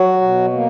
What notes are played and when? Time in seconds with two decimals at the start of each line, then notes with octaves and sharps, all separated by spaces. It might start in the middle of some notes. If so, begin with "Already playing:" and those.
Already playing: F#3 F#4
0.21 B2
0.53 A#3